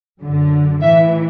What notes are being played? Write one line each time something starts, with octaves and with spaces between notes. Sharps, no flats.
F#2 D3
A2 E3 E5